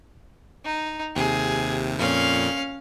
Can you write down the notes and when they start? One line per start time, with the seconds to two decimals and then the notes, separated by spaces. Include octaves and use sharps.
0.65 D#4
1.16 D#2 C3 G#4
1.99 F2 A#2 C#4 F5